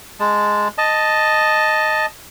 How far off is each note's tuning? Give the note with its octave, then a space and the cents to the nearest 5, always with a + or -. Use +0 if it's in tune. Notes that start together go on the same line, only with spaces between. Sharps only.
G#3 +0 A5 +0
D#5 +0 A5 +0